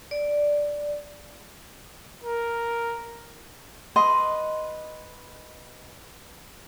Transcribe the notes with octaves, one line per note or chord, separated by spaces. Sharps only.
D5
A#4
B4 D#5 C6